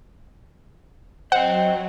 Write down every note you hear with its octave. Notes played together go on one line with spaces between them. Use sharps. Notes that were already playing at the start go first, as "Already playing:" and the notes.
F#3 C5 D#5 F#5 G5